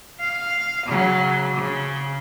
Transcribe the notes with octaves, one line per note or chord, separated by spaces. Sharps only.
F5
C#3 F#3
C#3